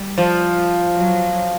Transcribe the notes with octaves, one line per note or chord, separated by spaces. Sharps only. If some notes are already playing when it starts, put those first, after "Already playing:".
Already playing: G3
F3
F#3